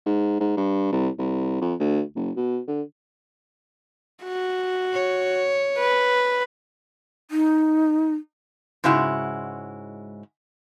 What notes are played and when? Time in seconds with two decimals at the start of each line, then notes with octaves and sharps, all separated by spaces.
0.06 G#2
0.40 G#2
0.57 G2
0.92 C2
1.19 C2
1.61 F2
1.79 D2
2.15 F#1
2.36 B2
2.68 D3
4.24 F#4
4.93 C#5
5.78 B4
7.31 D#4
8.84 G#2 C#3 G#3 E4 F#4